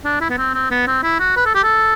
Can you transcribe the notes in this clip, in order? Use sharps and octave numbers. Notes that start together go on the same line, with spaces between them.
D4
E4
B3
C4
C4
B3
C4
E4
F#4
B4
A4
G4
A4